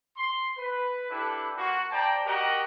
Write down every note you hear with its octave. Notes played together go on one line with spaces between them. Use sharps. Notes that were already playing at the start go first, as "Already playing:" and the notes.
C6
B4
D4 E4 G4 A4 B4
A#3 F4 F#4
C5 D5 G5 A5 A#5
F#4 G4 A#4 D#5 F#5